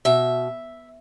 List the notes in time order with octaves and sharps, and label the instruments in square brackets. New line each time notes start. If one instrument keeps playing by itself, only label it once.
[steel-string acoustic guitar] B2 E5